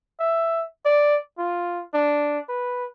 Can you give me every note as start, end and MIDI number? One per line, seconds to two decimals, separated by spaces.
0.20 0.64 76
0.85 1.17 74
1.38 1.81 65
1.94 2.40 62
2.49 2.85 71